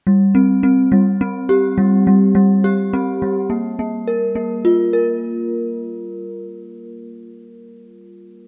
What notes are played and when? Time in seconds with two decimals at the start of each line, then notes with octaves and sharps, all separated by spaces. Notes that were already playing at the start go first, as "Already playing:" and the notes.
0.07 G3
0.35 C4
0.63 C4
0.92 G3
1.21 C4
1.49 G4
1.78 G3
2.07 G3
2.35 G3
2.64 G4
2.93 C4
3.22 G3
3.50 A#3
3.79 A#3
4.07 A#4
4.35 A#3
4.65 F4
4.93 A#4